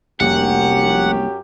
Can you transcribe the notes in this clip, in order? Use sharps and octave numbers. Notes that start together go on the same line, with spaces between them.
F1 C2 F#2 A#3 G4 F#5